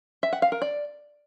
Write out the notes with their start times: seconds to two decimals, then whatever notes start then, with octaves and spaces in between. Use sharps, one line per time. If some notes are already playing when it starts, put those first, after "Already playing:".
0.23 E5
0.33 F#5
0.42 F5
0.52 A#4
0.62 D5